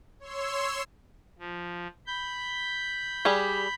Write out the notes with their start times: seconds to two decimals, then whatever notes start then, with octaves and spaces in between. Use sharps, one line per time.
0.19 C#5 C6 E6
1.39 F3
2.07 B5 G6
3.25 G3 G4 G#4